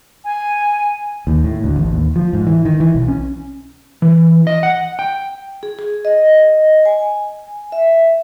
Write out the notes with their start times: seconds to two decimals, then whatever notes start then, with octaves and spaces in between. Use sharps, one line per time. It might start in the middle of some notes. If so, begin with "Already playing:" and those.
0.24 G#5
1.27 D#2
1.44 A2
1.64 D2
1.76 A1
1.93 D#2
2.16 F3
2.33 G#2
2.47 E3
2.65 D#3
2.80 E3
2.95 B1
3.08 C#4
4.02 E3
4.47 D#5
4.63 F#5
4.99 G5
5.63 G#4
5.79 G#4
6.05 D#5
6.86 G#5
7.72 E5